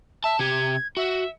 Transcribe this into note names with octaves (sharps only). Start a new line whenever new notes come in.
E5 A5
C3 G4 G#6
F#4 E5